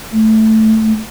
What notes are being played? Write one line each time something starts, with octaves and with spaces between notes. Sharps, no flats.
A3